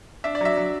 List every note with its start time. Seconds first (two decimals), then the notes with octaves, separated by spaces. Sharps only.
0.24 D4 E5
0.35 D5
0.41 F#3 E5
0.57 F#3